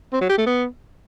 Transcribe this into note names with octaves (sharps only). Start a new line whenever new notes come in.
C4
F#3
G4
A3
B3